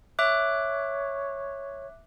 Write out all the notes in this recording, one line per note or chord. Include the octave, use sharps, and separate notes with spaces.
C#5 E5 D6 F#6